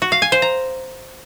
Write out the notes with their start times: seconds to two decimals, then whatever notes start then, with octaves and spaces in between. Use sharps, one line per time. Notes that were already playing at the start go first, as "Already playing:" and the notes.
0.02 F#4
0.12 F5
0.22 G#5
0.32 C5
0.42 A#5